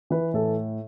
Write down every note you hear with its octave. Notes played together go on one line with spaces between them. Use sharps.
E3 B4
A2 A4